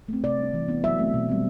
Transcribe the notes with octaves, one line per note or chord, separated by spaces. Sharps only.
A3 C4
C3 D5
G3 D4
E3
B3 D4
F#3 E5
A3 C4
B2
G3 C4